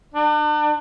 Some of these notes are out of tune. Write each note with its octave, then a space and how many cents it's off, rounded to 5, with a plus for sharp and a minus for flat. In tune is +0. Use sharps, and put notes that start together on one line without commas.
D4 +40